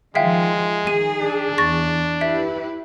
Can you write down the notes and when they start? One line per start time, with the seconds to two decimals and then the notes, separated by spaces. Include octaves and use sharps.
0.15 D#3 F3 G#3 F4 E5 F5 G5
0.87 D#3 G#4 D#7
1.21 D4
1.58 E2 C#6 A6 A#6
2.21 E4 G4 B4 E5